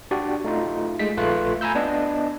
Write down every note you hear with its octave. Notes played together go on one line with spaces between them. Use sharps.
D4 F#4 G4 D5
A3 D#4 F4
G#3 A3 B6
A#1 A3 F4 B4 F#6
G#5 A#5 B5 E6 G6
B3 D4 D#5